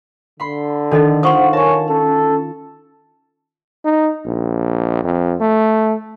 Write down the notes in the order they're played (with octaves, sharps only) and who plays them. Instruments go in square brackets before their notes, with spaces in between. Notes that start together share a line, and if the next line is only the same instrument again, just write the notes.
[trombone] D3 [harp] B5 C6
[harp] D#3 [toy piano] D4 A4 D#5
[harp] F4 [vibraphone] C5 F#5 [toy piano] C6 C#6 D#6
[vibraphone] A#4 G#5 [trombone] C#5 [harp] A5
[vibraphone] C#4 [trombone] A4
[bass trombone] D#4
A#1
F2
A3